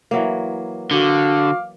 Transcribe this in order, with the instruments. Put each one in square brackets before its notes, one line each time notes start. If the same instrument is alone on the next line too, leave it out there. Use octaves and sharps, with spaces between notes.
[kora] E3 F#3 A#3
[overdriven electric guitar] D3 [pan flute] F#4 [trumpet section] F5 D6